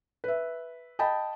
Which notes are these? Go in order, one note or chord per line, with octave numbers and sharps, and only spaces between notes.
B4 E5
D#5 G5 A5 B5